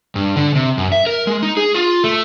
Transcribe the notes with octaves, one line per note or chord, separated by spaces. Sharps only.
G2
D3
C3
F#2
E5
A#4
G#3
D#4
G#4
F4
A3